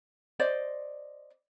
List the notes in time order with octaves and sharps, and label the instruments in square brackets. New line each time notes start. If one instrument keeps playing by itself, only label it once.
[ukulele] C5 D5 D#5